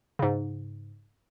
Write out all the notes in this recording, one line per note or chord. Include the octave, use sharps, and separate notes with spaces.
G#2 C#3